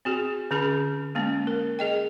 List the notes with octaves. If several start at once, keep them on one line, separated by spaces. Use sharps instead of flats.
C4 F#4 G#4
D3 C#4 G#4 B5
G#3 A#3 C#4
A#4
G#4 D#5 G5